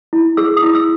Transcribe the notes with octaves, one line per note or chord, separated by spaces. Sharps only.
E4
G#4 E6
D#6
E4
E6